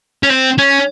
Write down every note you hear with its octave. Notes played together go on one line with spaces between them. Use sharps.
C#4
C4
C#4